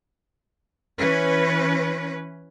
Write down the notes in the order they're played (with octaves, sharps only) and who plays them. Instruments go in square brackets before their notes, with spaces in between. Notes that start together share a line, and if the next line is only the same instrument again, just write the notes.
[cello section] E3 C#4 B4